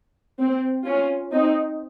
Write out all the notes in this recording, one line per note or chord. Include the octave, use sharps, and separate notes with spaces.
C4
C#4 F4
C4 D#4